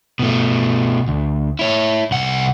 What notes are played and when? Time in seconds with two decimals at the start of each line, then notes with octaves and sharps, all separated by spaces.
0.19 B2 A3
1.08 D2
1.59 E4 C#5
2.11 C2 F#5